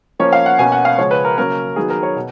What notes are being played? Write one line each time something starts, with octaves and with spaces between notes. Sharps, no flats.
F3 A#3 C#4 C#5
F5
F#5
B2 A#3 C#4 G#5
F#5
F5
C#3 F3 G#3 C#5
B4
A#4
C#3 F#3 A#3 C#4 A#4
D#3 F#3 B3 G#4
A#4
C#5
B2